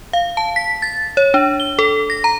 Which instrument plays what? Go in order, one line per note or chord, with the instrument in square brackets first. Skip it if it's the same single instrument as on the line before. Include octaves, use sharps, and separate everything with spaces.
[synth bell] F5
A5
B6
A6
C#5
D4
G7
A4
A#6
A#5